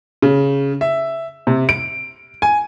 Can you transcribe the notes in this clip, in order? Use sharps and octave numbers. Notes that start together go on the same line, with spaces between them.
C#3
E5
C3
D7
G#5